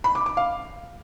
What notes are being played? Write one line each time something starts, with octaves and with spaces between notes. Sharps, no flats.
B5
D6
D6
F5